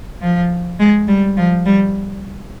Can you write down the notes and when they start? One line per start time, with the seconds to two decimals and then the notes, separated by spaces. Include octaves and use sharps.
0.21 F3
0.80 G#3
1.08 G3
1.37 F3
1.66 G3